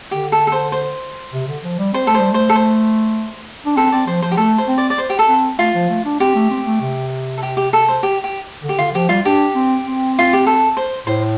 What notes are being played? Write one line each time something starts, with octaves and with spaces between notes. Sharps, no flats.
D3 G4
A4
A4
C5
C5
C3
D3
F3
G3
C4 C5
A3 A4
G3 C5
A3 C5
A4
C5
D4
C4 A4
C4 D5
F3 C5
F3 C5
G4
A3 A4
C5
C4
D5
D5
C5
G4
A4
C4
A3 F4
F3
A3
D4
C4 G4
A3
C4
A3
C3
A4
G4
G4
A4
C5
G4
G4
D3
G4
D3 F4
F3 G4
G3 F4
D4 G4
C4
C4
F4
G4
A4
C5
A2 C5